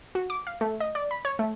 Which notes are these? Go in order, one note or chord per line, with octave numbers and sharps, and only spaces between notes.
F#4
D6
F5
A3
D#5
D5
B5
C#5
A3